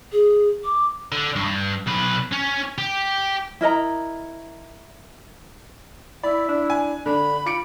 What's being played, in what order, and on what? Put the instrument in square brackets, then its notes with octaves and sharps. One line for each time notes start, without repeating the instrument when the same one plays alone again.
[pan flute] G#4
D6
[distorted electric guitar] D3
G2
B1 B4
C#4
G4
[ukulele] E4 A#4 D#5 A#5
[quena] E4 [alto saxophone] D5 [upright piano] B5
[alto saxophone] D4
[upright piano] G#5
[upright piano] D3 [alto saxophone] D4 [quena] B5
[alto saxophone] F4 [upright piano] D6 C#7 D7